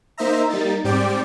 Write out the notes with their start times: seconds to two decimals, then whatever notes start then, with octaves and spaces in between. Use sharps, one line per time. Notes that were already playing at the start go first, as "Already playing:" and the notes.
0.18 A#3 D#4 C5 D#5 E5 A#5
0.49 G3 A#3 D#4 A6
0.84 G#2 G3 C4 D5 G5 D6